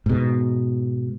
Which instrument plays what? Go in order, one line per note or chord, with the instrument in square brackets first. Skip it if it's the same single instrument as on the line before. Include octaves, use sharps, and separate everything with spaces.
[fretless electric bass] G#2 B2